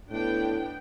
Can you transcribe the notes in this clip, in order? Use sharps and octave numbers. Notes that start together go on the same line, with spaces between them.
A2 B3 D4 G5